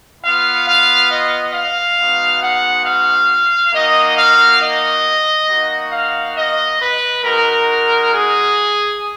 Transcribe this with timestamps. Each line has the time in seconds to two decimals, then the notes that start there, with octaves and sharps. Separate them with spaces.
0.23 B3 F4 F5
0.66 F5
1.10 D#5
1.54 F5
1.98 G#3 B3 D#4 F#4
2.42 F#5
2.85 F5
3.73 A#3 D#4 F#4 D#5
4.17 F5
4.61 D#5
5.48 A#3 D#4 F#4
5.92 F5
6.36 D#5
6.80 B4
7.23 G#3 D#4 F#4 A#4
8.12 G#4